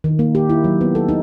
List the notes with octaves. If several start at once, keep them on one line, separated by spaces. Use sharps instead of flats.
D#3
A#3
G4
E4
F#3
B3
A4
D#4